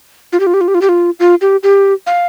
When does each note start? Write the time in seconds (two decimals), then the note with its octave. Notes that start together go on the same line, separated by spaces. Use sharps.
0.33 F4
0.40 G4
0.47 F4
0.54 G4
0.61 F4
0.68 G4
0.75 F4
0.82 G4
0.89 F4
1.20 F4
1.41 G4
1.63 G4
2.07 F5